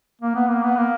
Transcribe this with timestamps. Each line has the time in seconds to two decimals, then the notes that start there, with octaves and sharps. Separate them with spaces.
0.21 A#3
0.35 B3
0.49 A#3
0.63 B3
0.77 A#3